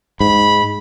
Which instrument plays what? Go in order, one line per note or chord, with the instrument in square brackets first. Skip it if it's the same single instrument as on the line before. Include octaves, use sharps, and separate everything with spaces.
[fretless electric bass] G#2 [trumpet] B5